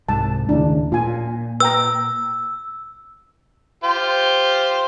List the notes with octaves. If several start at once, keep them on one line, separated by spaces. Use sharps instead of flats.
C2 G#2 A5
D#2 A2 C#3 D4 E4
A#2 F4 G#5
B4 G5 A#5 E6
F4 G4 C5